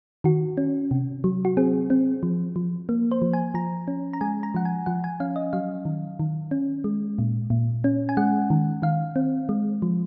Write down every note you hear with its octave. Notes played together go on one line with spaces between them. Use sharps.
D#3 F#4
C#4
C3
F#3
F#4
C4 G#4
C4
F3
F3
A#3
C5
F3
G#5
F3 A#5
C#4
A#5
G#3 G#5
A#5
F3 F#5
G#5
F3 F#5
G#5
C#4 F5
D#5
F#3 F5
D#3
D#3
C#4
G#3
A#2
A#2
C#4
G#5
G#3 F#5
D#3
D#3 F5
C4
G#3
F3